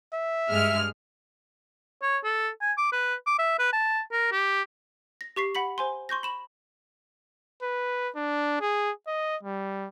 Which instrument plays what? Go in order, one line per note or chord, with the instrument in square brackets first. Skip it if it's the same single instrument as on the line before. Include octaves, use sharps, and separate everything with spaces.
[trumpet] E5
[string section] G2 G#3 F6
[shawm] C#5
A4
G#5
D6
B4
D6
E5
B4
A5
A#4
G4
[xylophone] A#6
G4 C#6 B6 C7
F#5 B5 B6 F#7
C5 G#5 C6
C6 C#6 G6 A#6
B5 E7 F#7
[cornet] B4
D4
G#4
D#5
G3